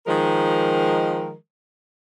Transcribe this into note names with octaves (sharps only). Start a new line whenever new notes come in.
D#3 F3 G#3 A#4